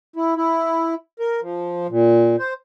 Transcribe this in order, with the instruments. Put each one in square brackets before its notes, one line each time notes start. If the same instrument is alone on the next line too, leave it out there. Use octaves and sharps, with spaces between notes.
[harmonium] E4
E4
A#4
F3
A#2
C5